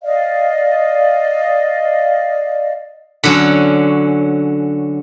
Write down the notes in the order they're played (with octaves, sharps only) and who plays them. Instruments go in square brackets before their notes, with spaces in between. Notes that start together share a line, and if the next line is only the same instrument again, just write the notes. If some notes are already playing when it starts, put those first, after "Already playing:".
[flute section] D5 D#5 F5
[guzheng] D3 F#3 C#4